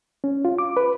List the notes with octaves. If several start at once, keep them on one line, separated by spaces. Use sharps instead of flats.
C#4
F4
D6
B4